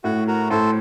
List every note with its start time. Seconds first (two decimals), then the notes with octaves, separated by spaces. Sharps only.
0.04 A2 F#4
0.28 F#4 A#4
0.50 A2 A4 C5